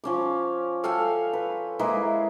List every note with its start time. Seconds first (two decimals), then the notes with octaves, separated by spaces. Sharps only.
0.04 F3 C#4 D6
0.84 A4 F5 G5 G#5
1.33 B4
1.79 G#3 A#3 E4 B4